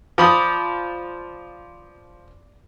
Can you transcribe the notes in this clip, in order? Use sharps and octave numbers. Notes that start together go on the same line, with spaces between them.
F3 D5 B5 D#6